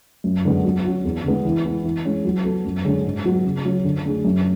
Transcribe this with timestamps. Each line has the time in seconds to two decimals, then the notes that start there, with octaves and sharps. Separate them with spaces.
0.24 F#2
0.45 D3 G#3 B3
0.65 F#3
0.85 C#4 F#4
1.05 E2
1.24 D3 G#3 B3
1.45 E3
1.64 G#3 B3 E4
1.84 E3
2.05 G#3 C#4
2.25 F#3
2.44 B3 F#4 A4
2.65 F#2
2.85 D3 G#3 C#4 G#4
3.05 G#2
3.25 F#3 B3 F#4
3.45 C#3
3.65 F#3 C#4
3.85 D3
4.05 A3 D4 G#4
4.25 F#2